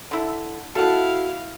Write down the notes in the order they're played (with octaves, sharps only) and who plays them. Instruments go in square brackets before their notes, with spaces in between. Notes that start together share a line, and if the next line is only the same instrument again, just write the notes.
[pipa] D3 E4
[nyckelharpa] E4 F5 [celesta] F#4 [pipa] A4 F#5